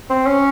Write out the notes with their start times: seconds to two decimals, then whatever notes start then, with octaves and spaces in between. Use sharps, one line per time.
0.10 C4
0.26 C#4